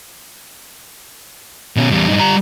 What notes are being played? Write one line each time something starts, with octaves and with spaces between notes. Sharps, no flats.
B2 C#4
E2 G3
G2 D#4
G3 A#5